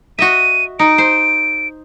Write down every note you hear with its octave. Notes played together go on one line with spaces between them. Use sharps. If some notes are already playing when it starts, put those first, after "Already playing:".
F#4 D#5 E5 D#7
D#4 D7
C5